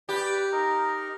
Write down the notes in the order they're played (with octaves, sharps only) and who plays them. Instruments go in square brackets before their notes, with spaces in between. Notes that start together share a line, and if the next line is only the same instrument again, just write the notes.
[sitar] G4 [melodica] B4 D5
[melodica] D#4 A#4